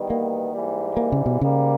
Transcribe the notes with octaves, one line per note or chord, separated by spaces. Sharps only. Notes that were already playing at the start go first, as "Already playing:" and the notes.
Already playing: E2 D#3 G3 B3
A#3
G#2 E3 G3
A#3
C#3
B2
G#2 C#3 G3 A#3